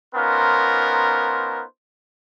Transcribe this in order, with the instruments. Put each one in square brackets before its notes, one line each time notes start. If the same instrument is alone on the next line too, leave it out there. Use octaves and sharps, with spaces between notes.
[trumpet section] B3 C#4 D#4 F4 A#4 C5